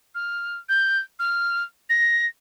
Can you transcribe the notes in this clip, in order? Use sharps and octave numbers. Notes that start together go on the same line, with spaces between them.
F6
G6
F6
A#6